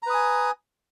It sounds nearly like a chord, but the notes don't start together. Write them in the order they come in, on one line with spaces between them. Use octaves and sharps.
A#5 B4 D#6 G#5